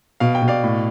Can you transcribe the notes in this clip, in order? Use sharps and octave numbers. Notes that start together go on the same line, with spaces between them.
B2 F5
G5
B2
D5 F5
A2